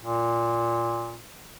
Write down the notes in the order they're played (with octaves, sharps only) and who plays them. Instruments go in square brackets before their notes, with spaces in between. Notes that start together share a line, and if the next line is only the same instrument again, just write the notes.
[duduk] A#2